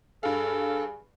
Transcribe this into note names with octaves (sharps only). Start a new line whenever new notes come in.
G2 G#4 A4 F5